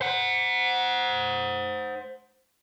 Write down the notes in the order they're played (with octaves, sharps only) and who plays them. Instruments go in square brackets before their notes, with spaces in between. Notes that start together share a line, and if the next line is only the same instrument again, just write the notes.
[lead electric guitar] C5 F#5